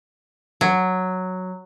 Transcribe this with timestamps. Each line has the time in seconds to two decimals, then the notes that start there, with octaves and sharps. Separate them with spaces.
0.61 F#3